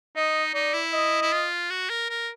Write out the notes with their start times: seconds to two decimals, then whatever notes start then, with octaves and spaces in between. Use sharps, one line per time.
0.16 D#4 D#5
0.54 D#4 D5
0.74 E4
0.93 D#5
1.22 E4
1.33 F4
1.70 F#4
1.90 A#4
2.10 A#4